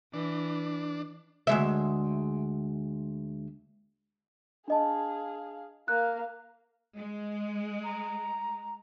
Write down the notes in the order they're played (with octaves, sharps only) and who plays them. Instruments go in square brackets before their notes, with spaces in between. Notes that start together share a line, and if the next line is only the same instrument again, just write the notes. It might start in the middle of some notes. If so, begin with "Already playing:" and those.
[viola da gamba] E3 [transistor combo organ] D4
[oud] D2 G#3 E5
[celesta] D4 D#5 A5 [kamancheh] G#4 F5
[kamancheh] A#3 F5 [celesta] F#6
[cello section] G#3
[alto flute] A#5